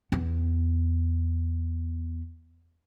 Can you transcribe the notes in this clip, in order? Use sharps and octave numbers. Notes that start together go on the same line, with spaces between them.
E2 B3